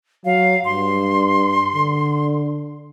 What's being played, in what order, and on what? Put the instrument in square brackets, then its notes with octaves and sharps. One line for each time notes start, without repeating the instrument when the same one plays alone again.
[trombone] F#3 [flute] F5
[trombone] G2 [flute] C6
[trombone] D3